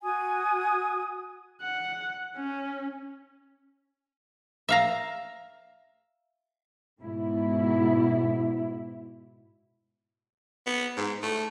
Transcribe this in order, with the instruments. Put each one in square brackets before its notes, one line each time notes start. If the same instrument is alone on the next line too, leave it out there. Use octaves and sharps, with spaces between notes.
[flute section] F#4 G#5 D#6
[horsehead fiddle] F#5
C#4
[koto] E5 F5 A#5
[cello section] G#2 B2 E4
[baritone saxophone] B3
G#2
A3